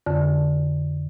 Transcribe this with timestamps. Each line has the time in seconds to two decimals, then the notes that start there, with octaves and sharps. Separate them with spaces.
0.06 F2 D3